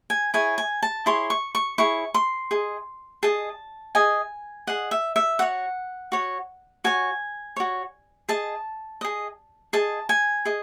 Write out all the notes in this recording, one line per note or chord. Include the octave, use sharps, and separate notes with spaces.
G#5
E4 G#4 C#5 G#5
G#5
A5
E4 G#4 C#5 C6
C#6
C#6
E4 G#4 C#5 C#6
C6
G#4 D#5
G#4 D#5 A5
G#4 D#5 G#5
G#4 D#5 F#5
E5
E5
F#4 C#5 F#5
F#4 C#5
F#4 C#5 G#5
F#4 C#5
G#4 D#5 A5
G#4 D#5
G#4 D#5 A5
G#5
G#4 D#5